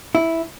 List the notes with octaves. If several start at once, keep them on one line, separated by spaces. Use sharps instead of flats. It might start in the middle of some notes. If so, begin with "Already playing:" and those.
E4